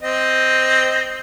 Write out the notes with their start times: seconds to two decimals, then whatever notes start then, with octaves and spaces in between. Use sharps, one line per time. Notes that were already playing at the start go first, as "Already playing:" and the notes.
0.02 C4 D#5